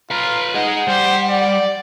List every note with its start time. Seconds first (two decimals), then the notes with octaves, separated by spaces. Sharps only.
0.11 F4 B4 A#5
0.54 D#4 G#4 D#5 F#5
0.88 G3 C5
1.29 D5